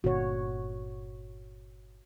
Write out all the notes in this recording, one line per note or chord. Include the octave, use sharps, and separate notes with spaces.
G1 A#2 D3 F#4 C#5